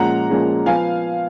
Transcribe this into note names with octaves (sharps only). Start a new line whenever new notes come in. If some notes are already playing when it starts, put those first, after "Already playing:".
Already playing: A#2 F3 G#3 C#4 F#5 A#5
A#2 F3 G#3 C#4
F3 B3 F5 G#5